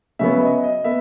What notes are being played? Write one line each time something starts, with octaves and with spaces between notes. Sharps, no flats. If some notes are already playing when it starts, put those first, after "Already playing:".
C#3 F#3 B3 E5
D#5
D#5
B3 E5